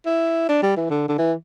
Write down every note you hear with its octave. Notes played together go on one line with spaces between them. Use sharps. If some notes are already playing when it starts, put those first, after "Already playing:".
E4
D4
G3
E3
D3
D3
E3